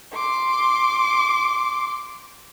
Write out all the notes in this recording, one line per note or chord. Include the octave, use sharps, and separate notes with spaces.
C6 D6